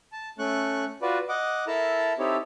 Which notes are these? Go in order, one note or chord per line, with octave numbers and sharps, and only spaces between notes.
A5
A3 C#4 C#6 F#6
F4 F#4 B4 D5
D#5 F#5 D6
E4 A4 A#4 A5 A#5
C4 D#4 E4 G4 A4 C#5